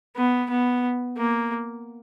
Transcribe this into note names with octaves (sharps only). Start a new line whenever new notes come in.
B3
B3
A#3